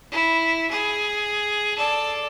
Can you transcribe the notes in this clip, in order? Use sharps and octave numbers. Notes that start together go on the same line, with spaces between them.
E4
G#4
A4 D5